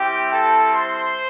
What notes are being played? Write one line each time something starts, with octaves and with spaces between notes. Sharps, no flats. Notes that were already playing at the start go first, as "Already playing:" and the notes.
Already playing: G3 C4 E4 G4 G5
A4 A5
C5 C6